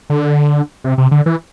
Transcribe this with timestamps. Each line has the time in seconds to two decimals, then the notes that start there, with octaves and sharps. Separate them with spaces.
0.10 D3
0.84 C3
0.98 C3
1.11 D3
1.26 E3